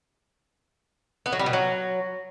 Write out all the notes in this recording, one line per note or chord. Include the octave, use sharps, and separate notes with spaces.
B3
F#3
G3
B2
F#3